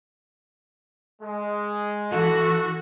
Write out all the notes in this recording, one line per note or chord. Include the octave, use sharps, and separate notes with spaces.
G#3
E3 F#4 A4